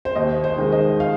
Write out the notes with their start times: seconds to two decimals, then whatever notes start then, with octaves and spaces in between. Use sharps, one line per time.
0.05 C5
0.15 D#2 D#5
0.44 C5
0.58 D#3 G#3
0.72 D#5
1.00 F5